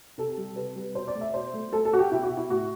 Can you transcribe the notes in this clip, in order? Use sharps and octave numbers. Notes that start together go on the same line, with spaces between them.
C3 A4
G3
C3 B4
G3
B2 C5
D5
A3
E5
B2 C5
A3
A3 A4
A4
F#3 F#4
G4
B2 E4
F#4
B2
E4
A2 F#4